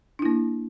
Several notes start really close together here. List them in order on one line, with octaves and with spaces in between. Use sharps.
D4 E4 A#3